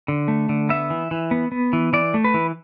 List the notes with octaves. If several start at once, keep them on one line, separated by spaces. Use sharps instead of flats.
D3
A3
D3
B3 E5
E3
E3
B3
B3
E3
E3 D5
A3
B4
E3